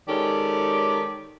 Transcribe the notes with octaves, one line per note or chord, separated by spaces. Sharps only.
D#3 G#3 C#4 G4 A4 D5